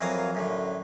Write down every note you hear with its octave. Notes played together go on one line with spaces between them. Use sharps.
F2 E3 F#3 A#4 F5 D#6
F#2 A2 D3